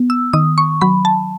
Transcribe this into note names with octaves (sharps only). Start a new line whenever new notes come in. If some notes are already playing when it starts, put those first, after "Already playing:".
Already playing: B3
E6
D#3 D#6
C#6
F#3 B5
A5